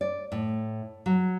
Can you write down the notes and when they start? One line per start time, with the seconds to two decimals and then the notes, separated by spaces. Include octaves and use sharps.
0.01 D5
0.32 A2
1.06 F#3